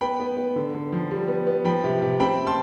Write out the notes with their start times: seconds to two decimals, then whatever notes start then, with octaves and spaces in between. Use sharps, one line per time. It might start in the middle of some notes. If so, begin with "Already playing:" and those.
0.01 B3 G5 B5
0.20 B3
0.37 B3
0.56 D3
0.74 D3
0.92 F3
1.11 G3
1.28 B3
1.47 B3
1.64 F3 G5 B5
1.84 C3
2.02 C3
2.20 C4 G5 B5
2.46 A5 C6